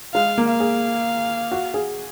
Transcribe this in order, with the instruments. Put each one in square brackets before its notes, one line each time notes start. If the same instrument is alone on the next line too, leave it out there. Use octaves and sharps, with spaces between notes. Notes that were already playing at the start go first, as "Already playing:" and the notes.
[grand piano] G#3 [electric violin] F5
[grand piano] A#3
[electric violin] F5
[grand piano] G#4
F#4
G#4